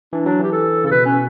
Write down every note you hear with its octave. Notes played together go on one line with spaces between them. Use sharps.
E3 D4
F#3 D4
E3 G4
A4
C#3 A4
B2 B4
C#4